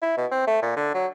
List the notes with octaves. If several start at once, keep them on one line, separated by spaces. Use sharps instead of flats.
E4
B2
C4
A3
A#2
D3
F#3